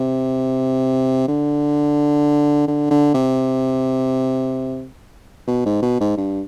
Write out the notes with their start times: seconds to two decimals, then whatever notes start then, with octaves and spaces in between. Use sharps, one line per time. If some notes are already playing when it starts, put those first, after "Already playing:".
Already playing: C3
1.28 D3
2.68 D3
2.90 D3
3.14 C3
5.47 B2
5.65 G#2
5.82 B2
6.00 G#2
6.17 G2